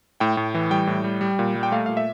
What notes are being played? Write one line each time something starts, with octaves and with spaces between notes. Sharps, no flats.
A2 G5
A2
E3
G3 G5
A2
G3
G3
A#2
G3
G5
A3 F5
A#2 F5
E5